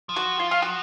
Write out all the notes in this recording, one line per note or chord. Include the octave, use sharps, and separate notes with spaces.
F3
F#4
F4
F4
F#4